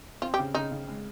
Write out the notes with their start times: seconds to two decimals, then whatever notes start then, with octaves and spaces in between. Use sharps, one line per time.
0.22 C4 F4
0.34 G4
0.39 C#3
0.55 C#3 D#4
0.71 C#3
0.88 G#3